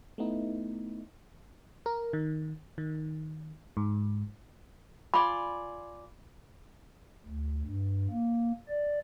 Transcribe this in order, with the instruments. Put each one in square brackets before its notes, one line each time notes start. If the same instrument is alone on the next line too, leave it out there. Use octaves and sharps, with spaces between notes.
[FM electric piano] A3 B3 D#4 E4
A#4
D#3
D#3
G#2
[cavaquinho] F4 D5 G#5 [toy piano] B5
[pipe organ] D2
G2
A#3
D5